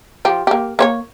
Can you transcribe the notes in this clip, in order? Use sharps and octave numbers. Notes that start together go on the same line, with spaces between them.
F3 G4
A#3 G4
A#3 C5 C#5